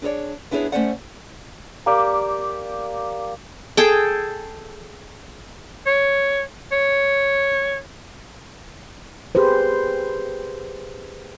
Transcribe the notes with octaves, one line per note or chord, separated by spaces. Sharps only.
D4 G#4 A#4 C#5 D5
B3 D4 E4 G#4 B4 C#5
A3 A#3 C#4 C5 D5 F#5
A#3 G4 D5
G#4 A4 G5
C#5
C#5
G4 G#4 B4 C5